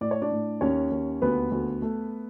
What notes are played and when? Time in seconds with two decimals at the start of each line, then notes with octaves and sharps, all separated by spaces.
0.01 A2 D5
0.11 C#5
0.22 D4 D5
0.32 A2
0.61 D#2 C#4 C#5
0.91 D#2
1.22 D2 B3 B4
1.51 D2
1.82 A3